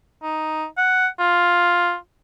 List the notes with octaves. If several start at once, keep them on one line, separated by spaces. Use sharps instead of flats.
D#4
F#5
F4